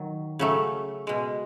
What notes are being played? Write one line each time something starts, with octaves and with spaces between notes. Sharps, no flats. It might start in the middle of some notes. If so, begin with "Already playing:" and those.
Already playing: D#3 F#3
C#3 F#3 A3
B2 G#3